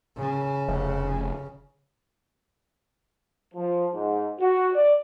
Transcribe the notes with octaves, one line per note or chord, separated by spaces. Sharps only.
C#3
F1
F3
G#2
F#4
D5